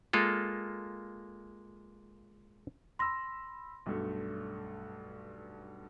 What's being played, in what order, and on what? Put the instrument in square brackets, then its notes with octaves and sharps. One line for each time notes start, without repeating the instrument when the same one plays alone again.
[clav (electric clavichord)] G#3 A#3 F4 A4
[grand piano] B5 E6 [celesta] C6 A#6
[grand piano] B1 G2 A3